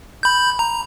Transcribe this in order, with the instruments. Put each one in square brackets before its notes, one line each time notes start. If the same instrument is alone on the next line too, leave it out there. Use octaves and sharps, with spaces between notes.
[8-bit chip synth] B5 G6
A#5